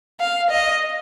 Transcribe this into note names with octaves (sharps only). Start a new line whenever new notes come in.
F5
D#5